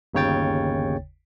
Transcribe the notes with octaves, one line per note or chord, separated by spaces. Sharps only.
G1 D#2 C#3 C#5 G5 A6